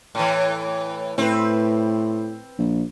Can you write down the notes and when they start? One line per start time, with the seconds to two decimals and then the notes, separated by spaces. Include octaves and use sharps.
0.15 A2 E3
1.18 A2 C4 B4
2.58 A#1